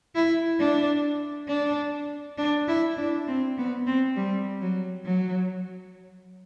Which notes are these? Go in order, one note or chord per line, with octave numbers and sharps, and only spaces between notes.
E4
D4
D4
D4
E4
D4
C4
B3
C4
G3
F#3
F#3